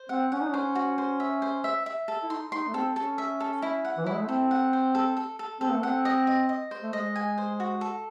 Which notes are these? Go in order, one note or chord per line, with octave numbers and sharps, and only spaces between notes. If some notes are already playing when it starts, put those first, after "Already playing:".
Already playing: C5
C4 F#5
C#4 F#5
D#4
C#4 C5
F#4
C5
E5
C5
E5
E5
A4
E4
D#4 C6
D#4 C6
A3
C4 A4
C#4 A4
E5
A4
E4
F#5
E3
F#3 E4
G#3
A3
C4 A4
F#5
C5
A4
A4
A4
C4 A4
A3
C4 F#5
D#5
D#5
D#5
C5
A3
G#3 D#5
G#5
C5
F#4
A4